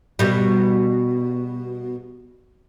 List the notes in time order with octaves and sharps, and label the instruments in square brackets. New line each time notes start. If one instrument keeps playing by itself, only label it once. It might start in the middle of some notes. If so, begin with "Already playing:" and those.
[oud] B2 G3